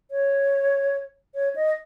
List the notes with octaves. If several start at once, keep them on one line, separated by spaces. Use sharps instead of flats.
C#5
C#5
D#5